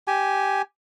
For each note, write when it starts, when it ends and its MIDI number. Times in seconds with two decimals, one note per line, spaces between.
0.08 0.62 67
0.08 0.62 80